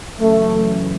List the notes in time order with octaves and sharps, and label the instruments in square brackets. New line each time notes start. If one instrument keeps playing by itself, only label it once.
[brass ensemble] F#2 C#3 E3 A3